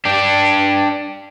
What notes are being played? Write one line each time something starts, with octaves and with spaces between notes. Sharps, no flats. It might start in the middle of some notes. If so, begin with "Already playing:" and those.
D4 G4